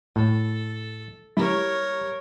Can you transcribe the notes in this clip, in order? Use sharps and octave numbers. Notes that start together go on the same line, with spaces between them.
A2 A4
G3 E4 A#4 C#5 A#5 E7